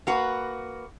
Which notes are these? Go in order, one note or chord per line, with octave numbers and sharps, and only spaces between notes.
A#3 F#4 B4